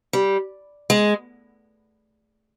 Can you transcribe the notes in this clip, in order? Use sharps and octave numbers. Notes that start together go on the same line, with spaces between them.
G3
G#3